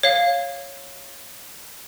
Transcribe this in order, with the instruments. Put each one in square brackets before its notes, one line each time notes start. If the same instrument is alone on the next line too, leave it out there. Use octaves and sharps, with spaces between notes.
[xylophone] C#5 F5